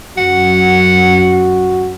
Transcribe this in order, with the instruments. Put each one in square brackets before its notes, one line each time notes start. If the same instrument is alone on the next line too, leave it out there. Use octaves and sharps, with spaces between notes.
[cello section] F#2 [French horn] F#4 [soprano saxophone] F#5